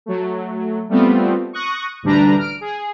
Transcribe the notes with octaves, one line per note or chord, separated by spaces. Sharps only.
F#3 A3
G3 A3 B3 C4 F4
C#6 D#6 F#6 A#6
A1 D2 G3 D4 B4 A#5
F6 D7
G#4